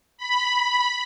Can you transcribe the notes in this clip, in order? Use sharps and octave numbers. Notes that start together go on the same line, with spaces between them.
B5